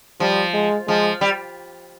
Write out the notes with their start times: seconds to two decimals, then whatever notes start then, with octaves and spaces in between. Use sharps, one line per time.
0.20 F3 G3
0.54 G#3
0.88 F3 G#3
1.21 G3